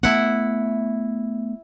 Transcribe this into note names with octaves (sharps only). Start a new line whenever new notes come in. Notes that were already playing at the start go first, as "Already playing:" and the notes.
A3 B3 E4 F#5